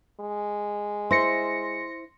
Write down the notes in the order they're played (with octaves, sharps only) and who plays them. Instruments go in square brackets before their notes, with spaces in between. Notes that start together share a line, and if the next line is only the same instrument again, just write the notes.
[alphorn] G#3
[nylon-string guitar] E4 C5 [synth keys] C6 A#6 C#7